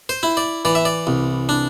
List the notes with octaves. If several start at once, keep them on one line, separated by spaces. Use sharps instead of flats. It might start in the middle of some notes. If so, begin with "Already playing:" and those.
C5
E4
D5
E3 D5
E5
D5
C2
D4